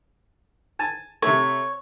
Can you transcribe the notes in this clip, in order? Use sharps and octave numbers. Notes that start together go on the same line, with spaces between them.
G#5 A5
C3 A3 C#5